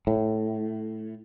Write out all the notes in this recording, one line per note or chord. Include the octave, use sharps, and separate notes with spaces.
A2